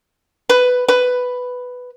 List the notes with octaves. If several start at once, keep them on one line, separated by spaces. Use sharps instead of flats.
B4
B4